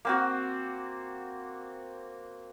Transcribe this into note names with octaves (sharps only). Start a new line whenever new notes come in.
A#3 C4 F#4